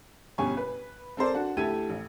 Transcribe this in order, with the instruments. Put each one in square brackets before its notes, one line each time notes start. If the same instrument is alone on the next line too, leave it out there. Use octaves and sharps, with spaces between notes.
[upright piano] G1 B2 C#4 G4 G#5 C#6
B4
C4 A4 A#4 C5 D5
D4 F#4
D2 E4 G4 A4 G#6 D#7
A1